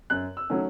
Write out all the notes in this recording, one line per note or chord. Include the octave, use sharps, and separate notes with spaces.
F#2 F#6
E6
D#3 F#3 A3 C#4